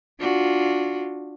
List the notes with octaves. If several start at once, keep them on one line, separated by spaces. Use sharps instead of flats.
D4 F4 F#4